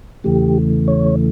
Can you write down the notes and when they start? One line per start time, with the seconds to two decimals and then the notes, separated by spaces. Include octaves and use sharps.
0.24 E2 C#3 E3 A3 G4
0.88 C#5